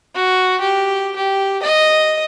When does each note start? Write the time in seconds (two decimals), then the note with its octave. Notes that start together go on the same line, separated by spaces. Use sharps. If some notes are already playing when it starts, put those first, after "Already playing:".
0.15 F#4
0.60 G4
1.16 G4
1.63 D#5